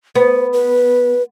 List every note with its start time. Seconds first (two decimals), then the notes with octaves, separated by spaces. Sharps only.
0.16 B3 C5
0.53 B4